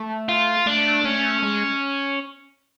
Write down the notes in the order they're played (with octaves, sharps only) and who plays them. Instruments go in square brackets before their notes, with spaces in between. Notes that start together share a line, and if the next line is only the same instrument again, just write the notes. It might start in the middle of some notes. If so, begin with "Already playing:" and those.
Already playing: [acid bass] A3
[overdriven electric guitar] F4
[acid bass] A3 [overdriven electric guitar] D4
[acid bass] A3 [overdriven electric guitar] C#4
[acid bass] G#3